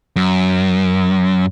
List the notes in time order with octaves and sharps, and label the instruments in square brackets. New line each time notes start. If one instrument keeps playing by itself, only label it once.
[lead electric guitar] F#2